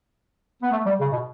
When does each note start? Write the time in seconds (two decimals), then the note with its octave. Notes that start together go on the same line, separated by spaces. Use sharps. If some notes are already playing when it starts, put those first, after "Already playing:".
0.62 B3
0.70 A3
0.85 G3
1.00 C#3
1.11 B2